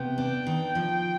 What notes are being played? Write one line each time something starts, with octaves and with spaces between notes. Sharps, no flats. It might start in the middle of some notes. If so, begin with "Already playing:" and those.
Already playing: C3 B3 G5
D4
D#3
F3